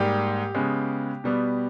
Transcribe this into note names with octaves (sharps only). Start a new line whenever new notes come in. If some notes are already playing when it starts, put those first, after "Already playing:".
Already playing: G#2 G3 A#3 G4
C#3 G#3 B3
B2 G3 B3